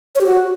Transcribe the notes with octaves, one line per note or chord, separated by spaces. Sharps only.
C#5
G4
F#4